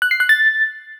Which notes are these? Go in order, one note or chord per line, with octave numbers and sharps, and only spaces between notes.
F#6
C7
F#6
A6